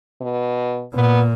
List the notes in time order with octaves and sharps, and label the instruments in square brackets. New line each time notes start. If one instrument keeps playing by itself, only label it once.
[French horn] B2
[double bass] A#2 [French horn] B3